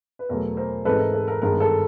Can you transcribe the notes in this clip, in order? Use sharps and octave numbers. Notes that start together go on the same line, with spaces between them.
B4
E2 B2 F#3 A3 A#4
A#4 C5
G#2 E3 G#3 C4 D#4 A4 B4
A#4
A4
A#4
G2 D#3 G#3 B3 A#4
A4